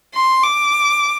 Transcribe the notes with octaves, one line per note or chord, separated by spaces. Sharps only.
C6
D6